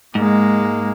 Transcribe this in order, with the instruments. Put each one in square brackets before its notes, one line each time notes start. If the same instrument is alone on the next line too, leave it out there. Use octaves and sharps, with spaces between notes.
[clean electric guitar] G#2 [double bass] G#3 A#3